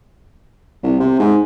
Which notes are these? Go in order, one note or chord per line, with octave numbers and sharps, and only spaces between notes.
C2
C3
G#2